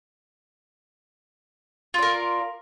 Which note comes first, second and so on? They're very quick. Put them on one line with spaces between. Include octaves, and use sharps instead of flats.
F4 D5 A#4